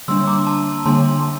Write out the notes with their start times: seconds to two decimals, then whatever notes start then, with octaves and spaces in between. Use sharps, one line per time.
0.08 D3 G3 A#3 D4 C6 E6
0.27 A#5 D6
0.47 A5 C6
0.85 D3 G3 A#3 D4 A5 C6